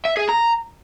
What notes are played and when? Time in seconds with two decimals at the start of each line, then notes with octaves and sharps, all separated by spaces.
0.05 E5
0.17 G#4
0.29 A#5